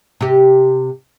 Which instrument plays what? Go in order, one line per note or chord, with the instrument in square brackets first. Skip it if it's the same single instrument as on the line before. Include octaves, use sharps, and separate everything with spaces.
[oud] C3 G4